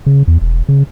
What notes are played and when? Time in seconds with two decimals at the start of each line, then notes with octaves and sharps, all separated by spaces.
0.06 C#3
0.28 E2
0.42 E1
0.69 C#3